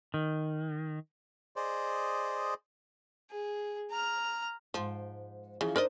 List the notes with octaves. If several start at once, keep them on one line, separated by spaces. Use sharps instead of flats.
D#3
G#4 C5 D5 D#5
G#4
A#5 F6
G#2 F3 G5
C#3 E3 F3
D4 D#4 A#4 C5 D5 D#5